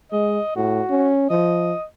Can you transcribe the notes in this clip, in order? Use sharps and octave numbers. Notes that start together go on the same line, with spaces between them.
G#3 D#5
A2 F#4
C#4
F3 D#5